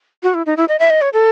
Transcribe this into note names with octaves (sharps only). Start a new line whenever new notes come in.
F#4
E4
D#4
E4
D#5
E5
D#5
C#5
A4